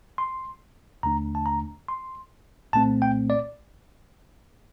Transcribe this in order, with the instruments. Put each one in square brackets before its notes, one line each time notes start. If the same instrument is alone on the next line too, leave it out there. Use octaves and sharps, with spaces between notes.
[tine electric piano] C6
D#2 D3 A3 D4 A#5
A5
A#5
C6
C2 A#2 A3 C4 A5
G5
D5